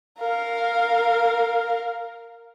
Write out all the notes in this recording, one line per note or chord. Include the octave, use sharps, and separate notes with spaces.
A#4 F5